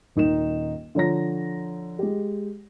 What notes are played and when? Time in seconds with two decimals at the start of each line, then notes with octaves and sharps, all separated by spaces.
0.16 D#1 D#3 D#4 D#5 E7
0.95 D3 F3 C#5 A#5 A#6
1.99 G#3 G4